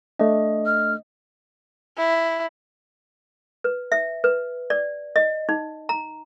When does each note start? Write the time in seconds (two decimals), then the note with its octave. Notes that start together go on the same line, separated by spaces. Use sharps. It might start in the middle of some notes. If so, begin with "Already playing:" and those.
0.19 A3 D4 D#5
0.66 F6
1.98 E4
3.64 B4
3.92 E5
4.24 B4
4.70 D5
5.16 D#5
5.49 D#4
5.89 A#5